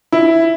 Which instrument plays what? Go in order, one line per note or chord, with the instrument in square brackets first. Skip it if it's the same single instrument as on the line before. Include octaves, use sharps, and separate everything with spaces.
[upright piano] E4